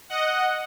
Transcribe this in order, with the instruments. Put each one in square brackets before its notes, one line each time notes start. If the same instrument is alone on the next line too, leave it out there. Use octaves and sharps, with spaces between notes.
[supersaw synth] D#5 F#5